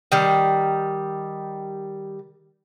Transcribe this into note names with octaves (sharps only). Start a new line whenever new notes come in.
D#3 G3